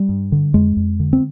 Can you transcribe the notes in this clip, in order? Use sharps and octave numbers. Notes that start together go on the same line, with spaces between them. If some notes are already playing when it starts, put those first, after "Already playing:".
Already playing: G3
G2
D3
F2 G#3
F2
D3
C4